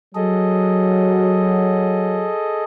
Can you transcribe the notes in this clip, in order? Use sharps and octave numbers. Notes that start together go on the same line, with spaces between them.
F#3 G#4 A4 D#5